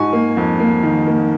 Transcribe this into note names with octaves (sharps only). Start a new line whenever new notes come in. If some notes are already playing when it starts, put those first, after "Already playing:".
Already playing: G#2 G#5 C#6
A#3
F2
A#3
D#3
A#3